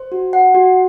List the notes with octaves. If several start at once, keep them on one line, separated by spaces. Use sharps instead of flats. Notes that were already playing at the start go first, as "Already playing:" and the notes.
Already playing: C5
F#4
F#5
F#4